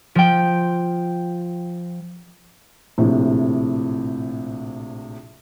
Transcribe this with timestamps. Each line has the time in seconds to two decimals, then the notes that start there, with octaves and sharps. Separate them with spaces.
0.15 F3 G5
2.98 A#1 A2 C3